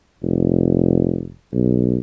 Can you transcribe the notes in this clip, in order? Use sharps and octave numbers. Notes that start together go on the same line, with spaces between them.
F1
B1